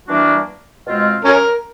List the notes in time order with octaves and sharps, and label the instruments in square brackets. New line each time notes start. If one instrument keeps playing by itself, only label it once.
[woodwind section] E3 G3 A#3 D4 F#4
B2 G#3 C4 F4
[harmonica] C#4 A#4